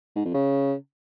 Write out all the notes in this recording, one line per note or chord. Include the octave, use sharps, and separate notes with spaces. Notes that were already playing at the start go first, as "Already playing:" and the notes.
G#2
F2
C#3